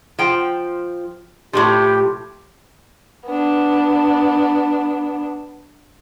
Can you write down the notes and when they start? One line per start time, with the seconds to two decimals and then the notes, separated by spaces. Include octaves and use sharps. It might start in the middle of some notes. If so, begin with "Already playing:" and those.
0.19 F3 G5
1.53 A2 C3 F3 G4
3.27 B3 D4